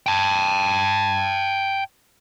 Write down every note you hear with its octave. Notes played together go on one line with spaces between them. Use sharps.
G5 A5